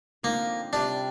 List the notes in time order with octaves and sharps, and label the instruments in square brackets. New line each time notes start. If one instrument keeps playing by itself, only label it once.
[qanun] D3 F3 C4 D#4 [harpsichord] A#3
[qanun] C3 G3 C4 F4 [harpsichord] D4